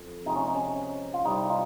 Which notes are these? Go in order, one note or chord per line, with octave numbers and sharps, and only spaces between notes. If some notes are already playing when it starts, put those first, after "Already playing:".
Already playing: F2
C3 F3 G#3 D#4
C#4
C#4
F4
C2 C3 G3 D#4
F4